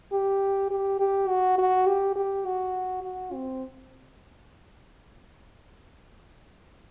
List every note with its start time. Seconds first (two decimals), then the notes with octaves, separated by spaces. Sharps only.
0.13 G4
0.71 G4
1.00 G4
1.29 F#4
1.58 F#4
1.87 G4
2.16 G4
2.46 F#4
3.03 F#4
3.33 C4